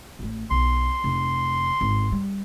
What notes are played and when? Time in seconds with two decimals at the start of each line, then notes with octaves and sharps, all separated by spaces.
0.19 A1 A3
0.51 B1 C6
1.04 F1
1.81 G#1
2.12 G3